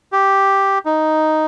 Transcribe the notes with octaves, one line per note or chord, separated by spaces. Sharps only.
G4
D#4